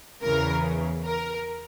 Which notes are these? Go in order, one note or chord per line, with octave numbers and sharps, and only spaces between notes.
E2 C#3 E3 A#4
A#4